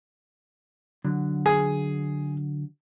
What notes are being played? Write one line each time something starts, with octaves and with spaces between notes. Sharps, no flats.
D3 F#3
G#4